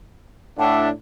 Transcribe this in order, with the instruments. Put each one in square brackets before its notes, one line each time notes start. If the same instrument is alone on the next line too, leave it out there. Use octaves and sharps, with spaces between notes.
[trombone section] A2 D4 [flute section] E5 F#5 A5